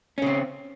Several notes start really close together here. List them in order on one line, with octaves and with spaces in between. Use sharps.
C#4 C#3 C4